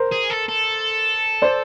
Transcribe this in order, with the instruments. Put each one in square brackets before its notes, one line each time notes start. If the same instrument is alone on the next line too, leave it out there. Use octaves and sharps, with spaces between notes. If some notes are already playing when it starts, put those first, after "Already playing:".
Already playing: [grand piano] A#4 C5
[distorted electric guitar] G#4
A4
A4
[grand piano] C5 D5